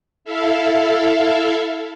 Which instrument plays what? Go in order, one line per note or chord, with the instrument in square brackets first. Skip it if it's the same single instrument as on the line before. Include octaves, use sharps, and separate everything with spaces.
[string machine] E4 A4 E5 F5